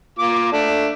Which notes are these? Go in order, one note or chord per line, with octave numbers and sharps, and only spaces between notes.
A#3 F4 D6
A3 D4